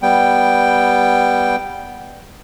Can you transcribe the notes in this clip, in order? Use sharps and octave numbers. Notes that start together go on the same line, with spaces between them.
G3 B3 G5